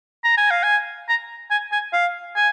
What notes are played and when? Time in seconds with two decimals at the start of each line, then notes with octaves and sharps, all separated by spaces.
0.24 A#5
0.37 G#5
0.51 F5
0.63 G#5
1.09 A#5
1.51 G#5
1.72 G#5
1.93 F5
2.36 G#5